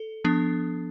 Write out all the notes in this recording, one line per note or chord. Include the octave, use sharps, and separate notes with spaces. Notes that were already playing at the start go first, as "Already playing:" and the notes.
Already playing: A4
F3 B3 D4